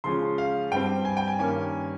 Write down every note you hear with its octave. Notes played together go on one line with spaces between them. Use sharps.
C#3 F3 G#3 C#4 C6
F5
G2 G3 C4 G5
G#5
G5
G#5
G2 D#3 A#3 C#4 G#5